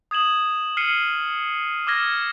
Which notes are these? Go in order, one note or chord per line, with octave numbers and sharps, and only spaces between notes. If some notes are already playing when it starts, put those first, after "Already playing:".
D#6 G#6 E7 F#7
F6 C7 C#7 D#7 F#7
D6 E6 F6 G#6 A#6